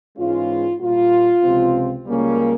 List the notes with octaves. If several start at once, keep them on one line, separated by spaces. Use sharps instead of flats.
G#2 E3 G#3 C#4 F4
A#2 G3 A#3 F4
C#2 C3 F3 C4
C#2 C#3 G3 A#3 C#4